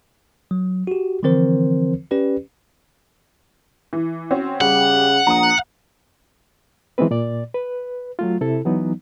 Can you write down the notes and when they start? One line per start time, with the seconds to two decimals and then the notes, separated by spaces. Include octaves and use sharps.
0.51 F#3
0.87 F#4 G4
1.23 D3 E3 F3 C4 A#4 C5
2.11 C#4 G4 B4 D5
3.93 E3
4.31 C4 C#4 F#4
4.61 C#3 G3 G4 F#5
5.27 A#1 A#5 D#6
6.98 E3 F#3 G#3 B3 C4 B4
7.11 A#2 D5
7.54 B4
8.19 F#3 A3 F4
8.41 C3 E4 A4
8.65 E3 F#3 B3 D#4